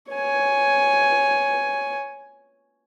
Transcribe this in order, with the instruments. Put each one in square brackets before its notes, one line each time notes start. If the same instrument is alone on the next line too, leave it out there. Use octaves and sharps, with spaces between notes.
[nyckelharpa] C#5 G#5